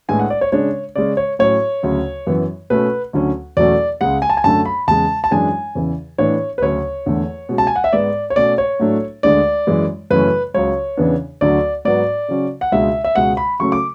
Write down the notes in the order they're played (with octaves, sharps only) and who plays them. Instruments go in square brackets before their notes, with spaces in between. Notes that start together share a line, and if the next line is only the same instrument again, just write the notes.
[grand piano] A2 G#3 B3 D4 G#5
F#5
D5
C#5
C#3 G#3 D4 C#5
C#3 G#3 C#4 D5
C#5
A2 F#3 C#4 C#5
D2 C#3 F#3
F#2 E3 B3
B2 A3 C#4 B4
D2 D3 F#3 C#4
E2 B2 F#3 A3 C#4 D5
C#2 C#3 G#3 F#5
G#5
A5
G#5
F#2 D3 A3 D4 A5
B5
E2 C#3 G#3 A5
A5
F#2 E3 G#3 D4 G#5
E2 C#3 E3
A2 E3 B3 D4 C#5
B4
D2 C#3 F#3 C#4 C#5
E2 D3 A3
B2 G#3 C#4
A5
G#5
F#5
E5
G#2 G#3 B3 D5
C#5
B2 A3 C#4 D5
C#5
A2 F#3 A3 D4
D2 D3 G#3 D4 D5
F#2 E3 G#3
F#2 C#3 E3 A3 C#4 B4
C#2 C#3 F#3 C#5
E2 C#3 E3 B3 D4
D2 D3 F#3 D5
G#2 F#3 B3 D5
C#3 F#3 C#4
F#5
C#2 B2 G#3 D4 E5
E5
C#2 B2 G#3 C#4 F#5
B5
C#3 F#3 A3 C#4 C#6
D6